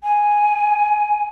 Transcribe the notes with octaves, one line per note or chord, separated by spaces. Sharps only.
G#5